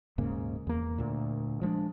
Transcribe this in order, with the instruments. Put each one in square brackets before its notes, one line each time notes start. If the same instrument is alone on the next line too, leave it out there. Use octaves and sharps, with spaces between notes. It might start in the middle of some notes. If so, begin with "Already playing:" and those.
[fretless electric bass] D#1 G#2 C#3 A#3
E2 A#3
D2 A#2
F3 G#3 A3 D4